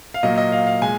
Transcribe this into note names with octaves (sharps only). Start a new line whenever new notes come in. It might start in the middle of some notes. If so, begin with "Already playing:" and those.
F5
A#2 F#3 A#3 D#5
D#5
F5
F5
A#2 G#3 G#5